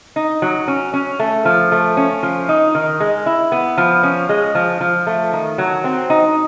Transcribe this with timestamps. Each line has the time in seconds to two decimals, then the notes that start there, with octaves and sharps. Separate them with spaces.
0.16 D#4
0.42 F#3
0.68 C#4
0.94 C#4
1.20 A3
1.45 F3
1.72 A3
1.97 C#4
2.23 F3
2.49 D#4
2.75 D#3
3.00 G#3
3.26 E4
3.52 B3
3.78 F3
4.03 C#4
4.29 G#3
4.55 F3
4.81 F3
5.07 A3
5.33 D#3
5.58 F#3
5.84 C4
6.10 D#4